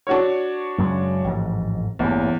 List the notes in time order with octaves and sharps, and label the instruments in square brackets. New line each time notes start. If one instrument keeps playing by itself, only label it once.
[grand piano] D4 F#4 C#5
[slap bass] F#2 C#3 G#3
A1 F2 G#2
[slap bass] A1 G2 A#2 [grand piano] E2